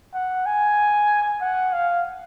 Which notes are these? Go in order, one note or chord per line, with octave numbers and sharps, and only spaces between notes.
F#5
G#5
F#5
F5